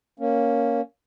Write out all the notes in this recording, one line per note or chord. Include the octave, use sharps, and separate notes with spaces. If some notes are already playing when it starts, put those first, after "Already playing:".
A#3 C#4